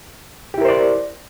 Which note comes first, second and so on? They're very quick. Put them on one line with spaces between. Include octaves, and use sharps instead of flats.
G4 E4 A#4 C5 D5